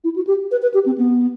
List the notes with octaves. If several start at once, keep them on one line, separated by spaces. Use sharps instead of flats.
E4
F#4
G4
B4
B4
G4
C4
B3